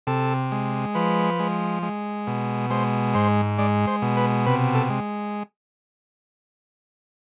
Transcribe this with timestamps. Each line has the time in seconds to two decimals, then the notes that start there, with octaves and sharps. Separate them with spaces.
0.07 C3 A4
0.52 G#3
0.95 F3 B4
1.39 G#3
1.83 G#3
2.27 B2
2.70 G#3 C5
3.14 G#2 C5
3.58 G#3 D5
3.87 C5
4.02 B2
4.17 B4
4.47 C3 B4
4.75 A4
4.90 G#3